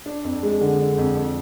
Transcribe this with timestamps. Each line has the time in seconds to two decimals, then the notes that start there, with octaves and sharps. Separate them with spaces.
0.06 D4
0.25 F2
0.43 G#3
0.61 D3
0.79 D4
0.98 F2
1.16 F2